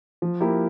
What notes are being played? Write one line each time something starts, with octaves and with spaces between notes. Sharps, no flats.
F3
A#3 E4 G4 A#4